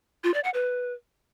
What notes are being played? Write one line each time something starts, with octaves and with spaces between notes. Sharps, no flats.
F4
D5
F#5
B4